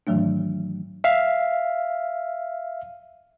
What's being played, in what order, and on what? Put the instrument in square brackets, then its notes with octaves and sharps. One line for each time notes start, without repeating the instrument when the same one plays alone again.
[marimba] G#2 D#3 E3 F#3 A3 D4
[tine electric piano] E5 F5